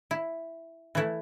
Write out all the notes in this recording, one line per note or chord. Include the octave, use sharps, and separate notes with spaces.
E4
E3 A3 E4